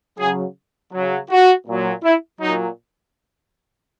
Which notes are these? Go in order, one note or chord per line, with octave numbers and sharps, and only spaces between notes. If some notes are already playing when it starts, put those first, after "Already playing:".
C#3 F#3 G#4
C#3 F#3
F#4
A#2 F#3
E4
A#2 F#3 D#4